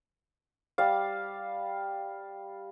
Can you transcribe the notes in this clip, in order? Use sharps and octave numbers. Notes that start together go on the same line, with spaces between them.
G3 D5 F5